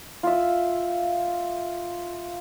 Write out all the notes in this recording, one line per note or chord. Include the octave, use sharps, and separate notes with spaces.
F4 E5